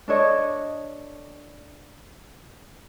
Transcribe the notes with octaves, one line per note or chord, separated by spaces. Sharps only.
D4 A4 C#5 D#5